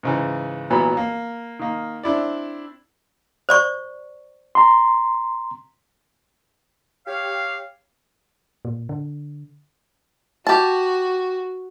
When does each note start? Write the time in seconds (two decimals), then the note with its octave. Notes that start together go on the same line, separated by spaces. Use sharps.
0.03 G#2 C#3 E3
0.70 G#1 A#2 E3 F#3 B3 B5
0.97 A#3
1.59 D#3 A#3
2.03 C4 D4 E4 D5
3.49 C5 D5 C#6
4.55 A#5 C6
7.06 G4 C#5 F5
8.65 A#2
8.89 D3
10.47 F#4 G4 A5